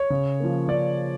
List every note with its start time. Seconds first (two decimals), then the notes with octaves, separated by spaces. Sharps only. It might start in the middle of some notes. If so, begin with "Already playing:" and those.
Already playing: C#5
0.10 C#3
0.40 F3 A#3
0.68 C#3 D5